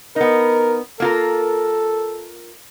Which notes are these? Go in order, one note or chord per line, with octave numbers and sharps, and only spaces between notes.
B3 D#4 A#4
A#3 F4 A4 A#4